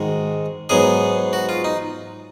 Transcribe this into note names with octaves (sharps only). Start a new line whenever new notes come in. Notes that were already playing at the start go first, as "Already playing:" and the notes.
Already playing: G#2 D#3 G#3 F#4
G#2 F#3 B3 G#4
F#4
F4
D#4